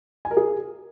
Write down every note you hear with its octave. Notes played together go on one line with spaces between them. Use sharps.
G#5
A#4
G#4